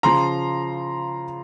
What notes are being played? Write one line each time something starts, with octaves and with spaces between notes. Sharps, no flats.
C#3 F3 A#5 C6